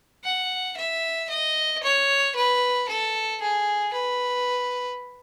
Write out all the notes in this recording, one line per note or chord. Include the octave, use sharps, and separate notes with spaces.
F#5
E5
D#5
C#5
B4
A4
G#4
B4